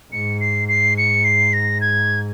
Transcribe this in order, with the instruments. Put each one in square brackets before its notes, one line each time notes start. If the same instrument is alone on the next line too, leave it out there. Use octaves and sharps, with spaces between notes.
[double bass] G#2 [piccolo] C#7
[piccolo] C7
C7
C#7
C7
A#6
G#6